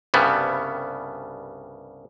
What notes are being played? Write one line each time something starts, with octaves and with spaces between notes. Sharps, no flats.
C2 G2 C#3 G3 B3